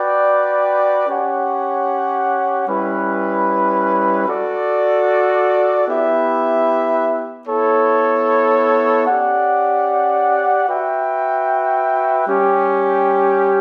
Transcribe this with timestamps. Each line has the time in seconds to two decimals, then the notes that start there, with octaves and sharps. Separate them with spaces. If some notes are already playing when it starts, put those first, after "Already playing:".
Already playing: F#4 B4 D5 G5
1.06 C#4 G4 C#5 F#5
2.67 G3 C#4 E4 B4
4.26 F#4 A4 D5
5.87 B3 E4 G4 B4 E5
7.47 B3 E4 A4 C#5
9.06 C#4 G4 D5 F#5
10.67 F#4 B4 E5 G5
12.26 G3 C#4 G4